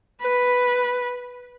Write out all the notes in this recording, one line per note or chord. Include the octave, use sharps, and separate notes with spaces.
B4